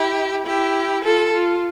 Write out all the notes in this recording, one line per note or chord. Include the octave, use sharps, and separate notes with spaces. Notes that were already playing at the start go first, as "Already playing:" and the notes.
Already playing: E4 G4
E4 G4
F4 A4
F4